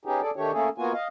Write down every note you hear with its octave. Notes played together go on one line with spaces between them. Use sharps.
B3 C#4 D#4 G4 G#4
G#4 A4 D5
D#3 A3 D4 G4 C#5
A3 A#3 C#4 G#4 A4
A#3 B3 F4 F#4 G#5
D#5 F5